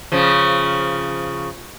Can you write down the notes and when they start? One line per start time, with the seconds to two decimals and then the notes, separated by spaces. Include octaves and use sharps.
0.12 C#3 F3